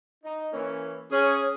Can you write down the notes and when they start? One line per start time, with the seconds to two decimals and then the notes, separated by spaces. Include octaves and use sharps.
0.24 D#4
0.53 E3 A#3 C#4
1.12 C#4 G#4 C#5